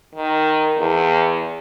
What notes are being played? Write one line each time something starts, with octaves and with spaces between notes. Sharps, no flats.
D#3
E2